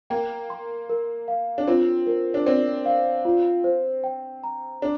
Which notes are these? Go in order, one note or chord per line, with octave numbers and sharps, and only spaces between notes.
A#3 G5
C6
A#4
F5
D4
C4 F4
A#4
D4
C4 D5
F5
F4
C5
G5
A#5
D4